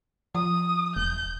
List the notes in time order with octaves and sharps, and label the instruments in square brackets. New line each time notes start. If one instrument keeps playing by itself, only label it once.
[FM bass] F3 [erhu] D#6
[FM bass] E1 [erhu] G6